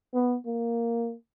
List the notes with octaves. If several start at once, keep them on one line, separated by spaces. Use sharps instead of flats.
B3
A#3